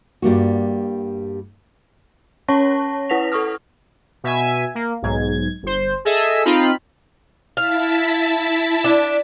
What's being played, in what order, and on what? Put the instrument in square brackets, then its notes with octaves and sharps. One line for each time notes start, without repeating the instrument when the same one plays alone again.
[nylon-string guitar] G2 G3 A#3 F#4
[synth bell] C#4 C#5 A5 C#6 A#6
E4 B4 F#5 A#6 B6 F7
A4 C#6 D#6 F6
[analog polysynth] B2 E5 G#5
A#3
B1 G#2 G#6
G1 C5
G#4 A4 D#5 E5 E6
C4 D#4 F4 B5
[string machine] E4 A5 B6 [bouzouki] F5
[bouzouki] D4